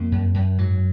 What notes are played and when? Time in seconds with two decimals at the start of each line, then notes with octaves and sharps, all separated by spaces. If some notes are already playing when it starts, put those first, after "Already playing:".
Already playing: F2 A#3
0.12 F#2
0.34 F#2
0.58 G#2 F#3